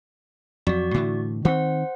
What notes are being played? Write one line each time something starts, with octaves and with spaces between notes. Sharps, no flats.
F2 F#3 F#4 D5 C#6
A2 D3 E3
D#3 C4 C5 F#5